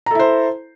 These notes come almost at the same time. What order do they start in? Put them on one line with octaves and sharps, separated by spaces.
A#5 A4 E4 C5